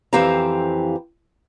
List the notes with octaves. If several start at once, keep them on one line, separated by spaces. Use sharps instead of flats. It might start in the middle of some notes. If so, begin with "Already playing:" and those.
F2 E3 C4 G4 F5 A#5